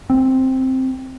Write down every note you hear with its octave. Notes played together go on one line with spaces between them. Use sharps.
C4